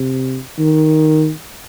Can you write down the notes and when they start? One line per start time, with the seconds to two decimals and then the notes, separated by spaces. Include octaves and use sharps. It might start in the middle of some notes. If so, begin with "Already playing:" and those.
Already playing: C3
0.59 D#3